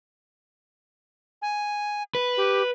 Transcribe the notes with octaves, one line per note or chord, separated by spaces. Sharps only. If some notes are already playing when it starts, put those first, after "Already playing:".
G#5
B4
G4